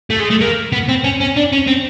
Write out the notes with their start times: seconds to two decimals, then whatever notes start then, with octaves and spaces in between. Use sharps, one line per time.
0.10 A3
0.20 G#3
0.30 A3
0.41 A#3
0.72 B3
0.89 C4
1.04 C#4
1.20 C#4
1.36 D4
1.52 C#4
1.67 C4